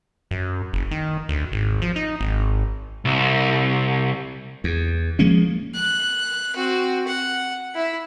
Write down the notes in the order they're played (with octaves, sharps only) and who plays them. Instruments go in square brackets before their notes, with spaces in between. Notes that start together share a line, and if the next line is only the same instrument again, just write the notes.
[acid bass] F#2
F#1
D#3
D2
G#1
F3
D#4
G#1
[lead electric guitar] C2
[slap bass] E2
F3 G#3 A#3 C#4
[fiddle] F#6
C4 F#4
F#5
E4 E5